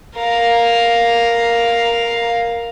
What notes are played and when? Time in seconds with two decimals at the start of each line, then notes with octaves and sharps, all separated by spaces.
0.16 A#4 F5